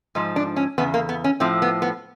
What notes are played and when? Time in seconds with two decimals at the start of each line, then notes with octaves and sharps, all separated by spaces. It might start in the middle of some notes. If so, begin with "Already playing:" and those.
0.15 G#2 F3
0.36 D4
0.56 C#4
0.78 E2 C#3 B3
0.94 A#3
1.09 B3
1.24 C#4
1.40 A2 F3 C4
1.62 B3
1.82 B3